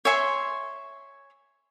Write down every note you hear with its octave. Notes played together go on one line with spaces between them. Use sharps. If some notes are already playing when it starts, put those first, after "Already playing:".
C#5 E5 G#5 C6